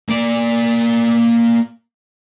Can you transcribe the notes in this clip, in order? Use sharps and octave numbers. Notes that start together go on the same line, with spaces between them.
A#3 D5